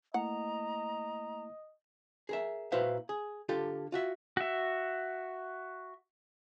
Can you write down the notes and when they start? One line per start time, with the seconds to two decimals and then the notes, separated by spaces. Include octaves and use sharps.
0.14 A3 A#3 E4 D#5 F#5 A#5
2.29 G#4 A#4 E5
2.72 A#2 E4 F#4 B4 C5 F5
3.09 G#4
3.49 D3 F4 G4 A4
3.92 F4 F#4 E5
4.37 F#4 E5